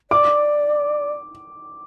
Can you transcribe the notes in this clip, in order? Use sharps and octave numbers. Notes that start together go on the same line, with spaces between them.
D5 D6